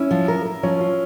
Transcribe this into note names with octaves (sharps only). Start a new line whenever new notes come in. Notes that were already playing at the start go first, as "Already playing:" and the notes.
Already playing: C#4 E4
F3
A#4
A#4
F3 C#4
F4